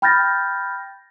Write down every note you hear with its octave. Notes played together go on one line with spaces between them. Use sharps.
G5 B5 F6 G6 A6 A#6